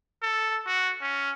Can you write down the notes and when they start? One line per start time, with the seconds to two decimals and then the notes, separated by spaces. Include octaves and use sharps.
0.22 A4
0.67 F#4
1.02 C#4